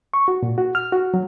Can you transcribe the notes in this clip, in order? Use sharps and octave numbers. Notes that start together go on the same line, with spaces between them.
C#6
F#4
A#2
F#4
F6
F#4
F#3